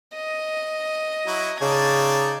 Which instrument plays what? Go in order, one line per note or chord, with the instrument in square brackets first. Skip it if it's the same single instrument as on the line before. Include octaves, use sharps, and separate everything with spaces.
[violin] D#5
[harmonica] F#3 E4 F#4
[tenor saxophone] C#3 [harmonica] D#4 D5 A5 [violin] G#6